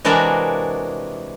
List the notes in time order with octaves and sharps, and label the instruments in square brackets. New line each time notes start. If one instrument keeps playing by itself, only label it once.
[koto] C3 E3 G#3 D4 F#4 A#4